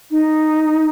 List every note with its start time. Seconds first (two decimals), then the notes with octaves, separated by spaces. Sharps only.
0.11 D#4